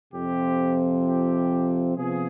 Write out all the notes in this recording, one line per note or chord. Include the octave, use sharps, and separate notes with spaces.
F2 C3 F3 C4 G4
G4
C3 F3 B3 G#4